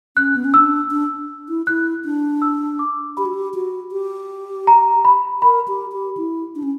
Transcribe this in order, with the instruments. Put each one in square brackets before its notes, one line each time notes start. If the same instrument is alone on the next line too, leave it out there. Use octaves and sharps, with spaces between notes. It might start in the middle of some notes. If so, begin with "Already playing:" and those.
[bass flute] C#4 [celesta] F#6
[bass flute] B3
C#4
[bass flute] D4 [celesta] E6
[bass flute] D4
E4
[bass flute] E4 [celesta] F#6
[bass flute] D4
[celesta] E6
D6
[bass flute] G4 [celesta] B5
[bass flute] F#4
G4
F#4
G4
[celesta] A#5
B5
[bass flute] A#4 [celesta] B5
[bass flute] G4
G4
E4
D4
C#4